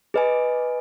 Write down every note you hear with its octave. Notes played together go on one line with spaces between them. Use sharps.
G#4 B4 D#5 G#5